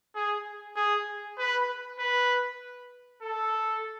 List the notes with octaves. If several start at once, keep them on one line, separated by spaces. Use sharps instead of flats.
G#4
G#4
B4
B4
A4